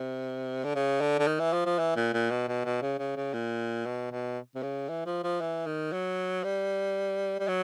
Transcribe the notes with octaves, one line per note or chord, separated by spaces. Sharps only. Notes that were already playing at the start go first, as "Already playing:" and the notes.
Already playing: C3
D3
C#3
D3
D3
D#3
E3
F3
F3
E3
A#2
A#2
B2
B2
B2
C#3
C#3
C#3
A#2
B2
B2
C3
C#3
E3
F3
F3
E3
D#3
F#3
G3
G3
F#3